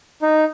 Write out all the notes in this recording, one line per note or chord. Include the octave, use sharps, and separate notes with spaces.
D#4